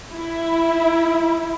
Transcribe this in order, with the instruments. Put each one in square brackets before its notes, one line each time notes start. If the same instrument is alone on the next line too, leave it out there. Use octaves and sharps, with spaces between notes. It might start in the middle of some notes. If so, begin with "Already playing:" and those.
[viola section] E4